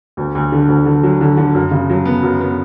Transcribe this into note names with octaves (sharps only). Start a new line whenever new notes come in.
D2
D2
D3
D2
D3
F#3
D3
D3
F#2
C#3
F#3
B3
F#2
B3